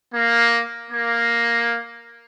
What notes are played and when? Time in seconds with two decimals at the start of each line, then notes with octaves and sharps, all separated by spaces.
0.14 A#3
0.91 A#3